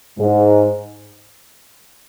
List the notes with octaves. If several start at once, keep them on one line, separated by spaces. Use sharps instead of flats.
G#2